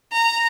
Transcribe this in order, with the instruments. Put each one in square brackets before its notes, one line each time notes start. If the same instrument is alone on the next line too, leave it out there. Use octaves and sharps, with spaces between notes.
[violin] A#5